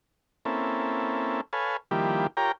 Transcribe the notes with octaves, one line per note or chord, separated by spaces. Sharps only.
A#3 C4 C#4 E4 A4
A4 B4 C#5 F5 G#5
D#3 F3 G3 A#3 E4 G4
F4 G4 A#4 C#5 G5 A#5